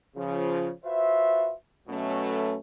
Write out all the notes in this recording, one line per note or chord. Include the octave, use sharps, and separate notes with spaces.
C#3 F3
F4 F#4 B4 C5 E5
B2 F#3 A3 C#4